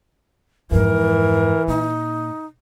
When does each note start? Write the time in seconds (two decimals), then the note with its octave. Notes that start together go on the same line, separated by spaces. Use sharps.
0.71 F2 G#2 E3 A#4
1.68 A#2 D#4